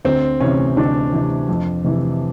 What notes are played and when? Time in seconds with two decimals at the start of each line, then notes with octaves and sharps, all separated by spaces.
0.05 D2 C4
0.40 C3 E3 C#4
0.77 D2 D4
1.13 C3 E3
1.49 F2
1.84 C3 E3